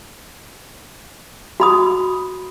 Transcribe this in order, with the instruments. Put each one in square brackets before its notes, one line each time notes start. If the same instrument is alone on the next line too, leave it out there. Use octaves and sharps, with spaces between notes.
[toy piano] F#4 B5 D#6